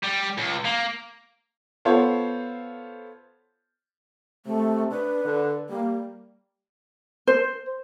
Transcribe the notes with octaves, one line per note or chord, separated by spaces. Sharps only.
G3
C#2
A#3
B3 F4 A4 C5 C#5
C3 A3
D4 B4
D3
G3 A#3
C5